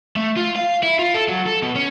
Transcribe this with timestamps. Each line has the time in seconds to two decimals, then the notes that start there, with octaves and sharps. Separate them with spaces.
0.16 A3
0.37 F4
0.56 F5
0.83 E4
0.99 F4
1.14 A4
1.28 F#3
1.46 A4
1.62 B2
1.75 C#4